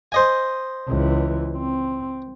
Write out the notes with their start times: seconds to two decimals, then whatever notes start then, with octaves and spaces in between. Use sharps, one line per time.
0.12 C5 D#5 G#5
0.88 C#2 E3
1.56 C4